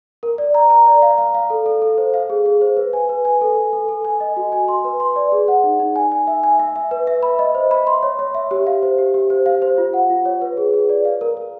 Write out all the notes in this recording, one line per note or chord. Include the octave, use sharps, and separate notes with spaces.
A#4
D5
A#5
A#5
D5
F5
F5
F5
A4
A4
A4
C5
F5
G#4
G#4
C5
B4
G#5
B4
G#5
A4
A4
A4
A4
G#5
D#5
F#4
G#5
C6
B4
C6
D5
G#4
F#5
D#4
D#4
G#5
G#5
E5
G#5
E5
E5
B4
E5
B5
D#5
C5
B5
C6
C#5
C#5
E5
G4
F5
C5
G4
G4
C5
F5
C5
F4
F#5
F4
C#5
B4
G#4
G#4
D5
F5
A#4
A#4